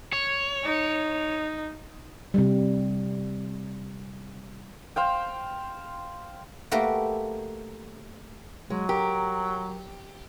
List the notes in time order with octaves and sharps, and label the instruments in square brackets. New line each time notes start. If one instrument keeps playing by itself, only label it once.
[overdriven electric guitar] C#5
[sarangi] D#4
[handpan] C3 G3
[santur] C5 F5 G5
[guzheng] A3 A#3 F#4 G4 B4
[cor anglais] F#3 [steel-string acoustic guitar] G#3
[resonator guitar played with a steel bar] G4 [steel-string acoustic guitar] A#4